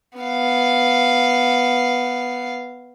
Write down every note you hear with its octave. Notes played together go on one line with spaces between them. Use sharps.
B3 F5